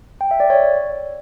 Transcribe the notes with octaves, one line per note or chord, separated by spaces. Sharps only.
G5
E5
D5
C#5